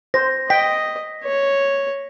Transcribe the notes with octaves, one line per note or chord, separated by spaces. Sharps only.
C5 A#6
D#5 G5 B6
C#5